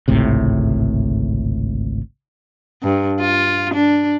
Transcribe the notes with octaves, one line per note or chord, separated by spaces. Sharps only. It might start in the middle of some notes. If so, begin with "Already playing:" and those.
G#1 C#2 A2 C3
G2
F4
D4